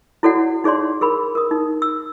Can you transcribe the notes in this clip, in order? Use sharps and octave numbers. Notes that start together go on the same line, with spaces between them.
E4 F#4 A4 C#5 D5 F#5
D#4 G#4 C#5 D5 C6
G#4 A#4 B5
A#4 D#6
D#4
E6